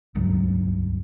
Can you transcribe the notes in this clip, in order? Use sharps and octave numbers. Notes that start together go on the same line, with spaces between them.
D#1 C#2 G2 F#3